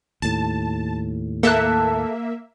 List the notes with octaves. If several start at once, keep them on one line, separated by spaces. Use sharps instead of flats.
D#2 A2 A5
A#3 A4 E5 A5 F#6